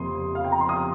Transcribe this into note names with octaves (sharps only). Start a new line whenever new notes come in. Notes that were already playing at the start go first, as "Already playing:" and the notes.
Already playing: F1 F2 C3 A#3 C6 D#6
F5
G5
A#5
C6
D#6